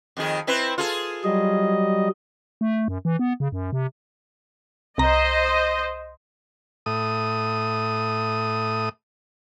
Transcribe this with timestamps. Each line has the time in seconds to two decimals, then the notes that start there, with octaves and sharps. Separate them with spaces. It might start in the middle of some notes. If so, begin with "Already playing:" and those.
0.17 F2 D#3 G#4
0.47 C4 E4 B4
0.78 F4 G#4 A4
1.24 F#3 G3 D#5
2.61 A3
2.88 F#2
3.05 E3
3.19 B3
3.40 C#3
3.52 F#2
3.73 C3
4.98 C2 C5 D#5 A#5
6.86 A2 D#6